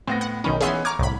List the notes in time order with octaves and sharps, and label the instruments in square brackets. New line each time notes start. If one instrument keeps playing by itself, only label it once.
[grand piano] A2 B3 A#6 [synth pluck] C4
[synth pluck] F#5
[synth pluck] B1 D#3 C#4 [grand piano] D#4 B5
[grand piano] E3 B3 C#4 [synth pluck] G#4 E5 C6
[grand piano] A#5 C#6 G#6 [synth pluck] D6 F6
[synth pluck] C2 A2 B5